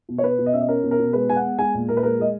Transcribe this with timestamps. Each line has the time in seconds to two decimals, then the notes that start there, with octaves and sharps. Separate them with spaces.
0.09 B2
0.18 C#5
0.24 B2 B4
0.39 B2
0.46 D#5
0.53 C#4 E5
0.61 D#5
0.68 C#4 A#4
0.83 B2
0.91 A#4
0.99 B2
1.13 G#3 B4
1.29 G#3 G#5
1.36 F#5
1.44 B3
1.58 G#3 G#5
1.74 A#2
1.89 A#2 A#4
1.97 B4
2.03 G#3 A#4
2.19 G#3 D#5